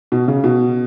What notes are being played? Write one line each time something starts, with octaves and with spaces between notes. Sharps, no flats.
B2
C#3
B2